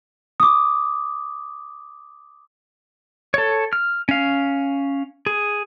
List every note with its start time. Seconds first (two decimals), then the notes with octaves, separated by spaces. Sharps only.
0.40 D6 D#6
3.34 A4 C#5
3.73 F6
4.09 C#4 F5
5.26 G#4